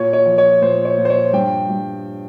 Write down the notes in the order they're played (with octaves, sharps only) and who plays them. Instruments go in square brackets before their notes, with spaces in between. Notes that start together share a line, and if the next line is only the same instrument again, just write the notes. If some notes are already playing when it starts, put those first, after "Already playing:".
Already playing: [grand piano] A#2 C#5
C#5
F3
C#5
A#2 C5
C#5
A#2
C5
C#5
G2 G5
G2